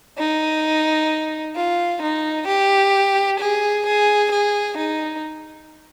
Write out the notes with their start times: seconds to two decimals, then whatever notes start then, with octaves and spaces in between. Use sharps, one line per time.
0.18 D#4
1.56 F4
2.02 D#4
2.48 G4
3.40 G#4
3.86 G#4
4.32 G#4
4.78 D#4